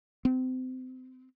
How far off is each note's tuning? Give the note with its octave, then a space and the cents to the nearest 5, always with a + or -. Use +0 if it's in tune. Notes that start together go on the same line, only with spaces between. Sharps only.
C4 -30